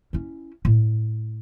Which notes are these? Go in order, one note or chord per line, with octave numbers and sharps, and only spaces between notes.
C#4 E4
A2